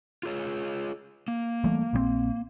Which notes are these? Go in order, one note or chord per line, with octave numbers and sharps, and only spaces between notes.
F4 G#4 C#5
A#3
E3 G3 A3
A#1 E3 C4